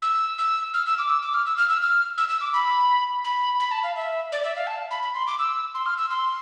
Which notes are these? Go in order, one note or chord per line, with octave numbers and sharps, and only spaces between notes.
E6
E6
F6
E6
D6
E6
D6
F6
E6
F6
E6
F6
E6
E6
D6
B5
B5
B5
A5
F5
E5
D5
E5
F5
A5
B5
B5
C6
D6
E6
C6
F6
E6
C6